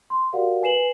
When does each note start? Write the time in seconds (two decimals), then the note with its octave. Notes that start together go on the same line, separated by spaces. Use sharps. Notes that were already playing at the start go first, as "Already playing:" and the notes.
0.10 C6
0.33 F#4 G4 A#4 D5 F5 F#5
0.62 B4 G#5 C7 E7 F#7